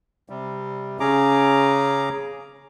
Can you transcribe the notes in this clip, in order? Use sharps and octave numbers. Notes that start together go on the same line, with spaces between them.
C3 G3
C#3 C#4 G#4 A#5 D6